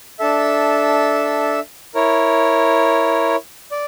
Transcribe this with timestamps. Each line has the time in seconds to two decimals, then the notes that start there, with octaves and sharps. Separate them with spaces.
0.19 D4 A4 E5
1.95 E4 A#4 C#5
3.71 D5